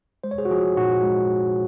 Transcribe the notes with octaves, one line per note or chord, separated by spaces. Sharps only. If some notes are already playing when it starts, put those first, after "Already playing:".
G#3 C5
C#5
G#4 C5
F#4
F3 F4 G#4
A#2 D#4 F#4
G#3